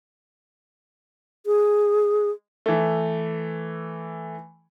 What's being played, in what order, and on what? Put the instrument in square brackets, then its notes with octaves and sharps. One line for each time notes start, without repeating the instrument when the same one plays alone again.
[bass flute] G#4
[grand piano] E3 A3